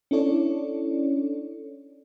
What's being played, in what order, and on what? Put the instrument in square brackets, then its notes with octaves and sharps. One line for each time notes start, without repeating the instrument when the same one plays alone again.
[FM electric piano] C#4 D4 E4 A4 C#5 D5